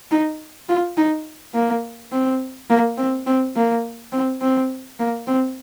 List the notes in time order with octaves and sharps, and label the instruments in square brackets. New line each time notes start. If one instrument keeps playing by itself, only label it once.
[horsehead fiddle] D#4
F4
D#4
A#3
C4
A#3
C4
C4
A#3
C4
C4
A#3
C4